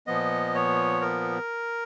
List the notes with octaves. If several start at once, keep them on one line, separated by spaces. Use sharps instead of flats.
A#2 F3 B3 D#5
C#5
A#4